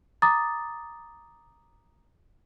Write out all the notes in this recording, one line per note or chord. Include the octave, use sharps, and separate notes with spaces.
A#5 D6 D#6 A6